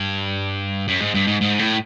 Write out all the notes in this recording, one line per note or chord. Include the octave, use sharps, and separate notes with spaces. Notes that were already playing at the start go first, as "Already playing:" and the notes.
Already playing: G2
F#2
G#2
G2
G#2
G#2
A2